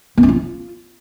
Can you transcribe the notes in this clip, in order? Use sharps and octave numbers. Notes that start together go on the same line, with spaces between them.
B3
C#4
F4